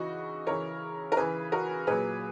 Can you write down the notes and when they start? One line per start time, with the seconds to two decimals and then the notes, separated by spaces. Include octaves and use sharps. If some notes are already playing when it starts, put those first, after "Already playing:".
Already playing: C#3 E3 D#4 F#4
0.47 C#3 E3 A#4 C#5
1.12 A#4
1.17 C#3 E3 G#4 B4
1.52 F#4 A#4
1.87 A#2 F#3 G#4 B4